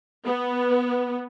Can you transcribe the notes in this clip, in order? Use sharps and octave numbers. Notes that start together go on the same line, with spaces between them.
B3